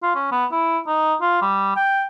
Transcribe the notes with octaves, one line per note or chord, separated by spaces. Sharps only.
F4
C#4
B3
E4
D#4
F4
G3
G5